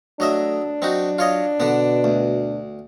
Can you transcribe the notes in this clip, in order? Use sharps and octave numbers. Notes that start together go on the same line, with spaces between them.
F#3 A3 D4 D#5 E5
F#3 C4 D#4 F#4
F4 C#5 D#5
B2 D3 B3
D2